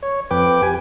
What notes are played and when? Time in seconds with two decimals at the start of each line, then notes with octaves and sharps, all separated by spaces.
0.03 C#5
0.31 F2 B4 G5 D6
0.63 G4 G#5